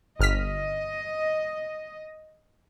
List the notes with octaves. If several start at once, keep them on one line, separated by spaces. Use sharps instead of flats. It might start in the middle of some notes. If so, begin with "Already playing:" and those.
G1 D#5 F6 B6